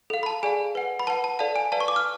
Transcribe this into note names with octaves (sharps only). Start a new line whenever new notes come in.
A4 F5
B5
A5
G#4 D5 F5 G#5
B4 F#5
B5
B4 F#5 A5
A5
A4 D5 F5 A5
G#5
B4 D5 F5 A5
C#6
D6
F6